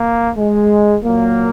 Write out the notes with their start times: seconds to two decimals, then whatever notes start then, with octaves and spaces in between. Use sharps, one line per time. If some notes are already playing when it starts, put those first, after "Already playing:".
Already playing: A#3
0.37 G#3
1.03 A#2 F#3 A#3